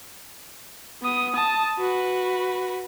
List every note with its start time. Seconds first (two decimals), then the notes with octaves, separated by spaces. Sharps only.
1.03 B3 D#6
1.35 A5 D#6
1.79 F#4 B4